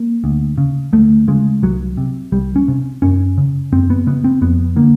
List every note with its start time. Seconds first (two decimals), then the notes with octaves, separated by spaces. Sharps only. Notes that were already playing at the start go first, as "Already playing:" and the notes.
Already playing: A#3
0.24 D2
0.58 C#3
0.93 D2 A3
1.28 C#3 G#3
1.63 C2 F#3
1.97 C3
2.32 C2 G3
2.56 C#4
2.68 C3
3.02 F#2 C#4
3.38 C#3
3.72 F#2 C4
3.90 B3
4.07 C#3 B3
4.24 C4
4.41 F2 B3
4.76 D3 A#3